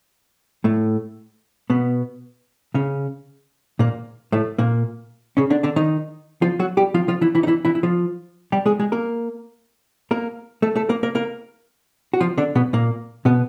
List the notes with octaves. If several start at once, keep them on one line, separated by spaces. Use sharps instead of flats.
A2 A3
B2 B3
C#3 C#4
A#2 A#3
A2 A3
A#2 A#3
C#3 C#4
D3 D4
D3 D4
D#3 D#4
F3 F4
F#3 F#4
G3 G4
F3 F4
F3 F4
E3 E4
E3 E4
D#4
E3 E4
E3 E4
E4
F3 F4
G3 G4
G#3 G#4
G#3 G#4
A#3 A#4
A#3 A#4
A3 A4
A3 A4
A#3 A#4
A#3 A#4
A#3 A#4
F#4
F3 F4
D3 D4
B2 B3
A#2 A#3
B2 B3